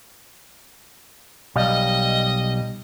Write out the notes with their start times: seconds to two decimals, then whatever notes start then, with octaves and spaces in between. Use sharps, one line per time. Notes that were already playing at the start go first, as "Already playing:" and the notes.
1.56 B1 G3 D#5 F5